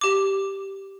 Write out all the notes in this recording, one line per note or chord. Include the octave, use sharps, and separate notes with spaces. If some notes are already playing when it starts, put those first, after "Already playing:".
G4 D6